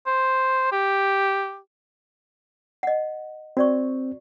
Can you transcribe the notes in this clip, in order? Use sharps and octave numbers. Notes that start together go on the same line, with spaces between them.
C5
G4
D#5 F#5
C4 F#4 D5 C#6